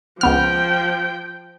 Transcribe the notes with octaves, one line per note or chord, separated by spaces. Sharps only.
C#2 F3 B3 G5 F6